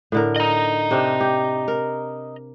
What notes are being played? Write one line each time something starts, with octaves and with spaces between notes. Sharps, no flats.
A2 D3 A#4
D#5 A#5
C3 C4 D4
G4
A#4